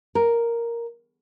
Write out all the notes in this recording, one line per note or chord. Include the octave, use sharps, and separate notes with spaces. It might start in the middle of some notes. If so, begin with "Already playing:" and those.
A#4